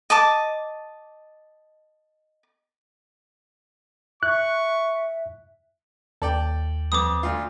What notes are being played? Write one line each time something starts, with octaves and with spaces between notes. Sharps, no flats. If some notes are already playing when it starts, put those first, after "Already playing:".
D#5 A5 D6
E5 C#6 F#6
D#2 A4 D5 G5
F2 B4 D6 D#6
D2 F4